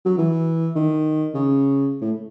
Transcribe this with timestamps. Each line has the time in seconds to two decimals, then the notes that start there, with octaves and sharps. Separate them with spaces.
0.05 F#3
0.18 E3
0.76 D#3
1.34 C#3
2.01 A2